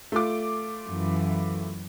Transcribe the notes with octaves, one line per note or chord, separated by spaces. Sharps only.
A3 F4 D6
F#2 E3